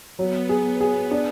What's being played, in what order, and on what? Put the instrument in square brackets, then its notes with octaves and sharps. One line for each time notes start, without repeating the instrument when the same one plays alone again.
[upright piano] F#3 [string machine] B3
[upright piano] G#4
G#4
D4